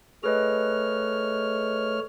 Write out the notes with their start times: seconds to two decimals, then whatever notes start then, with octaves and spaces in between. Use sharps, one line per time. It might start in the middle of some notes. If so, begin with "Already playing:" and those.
0.23 A3 G#4 B4 C#5 D#5 F6